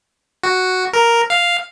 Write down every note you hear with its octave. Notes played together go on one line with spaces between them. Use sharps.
F#4
A#4
F5